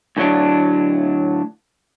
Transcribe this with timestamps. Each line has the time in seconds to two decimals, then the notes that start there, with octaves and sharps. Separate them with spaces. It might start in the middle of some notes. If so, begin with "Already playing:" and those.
0.17 D2 A2 D3 F#3 D4